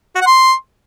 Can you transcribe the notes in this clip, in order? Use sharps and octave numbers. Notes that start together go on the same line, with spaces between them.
F#4
F#5
C6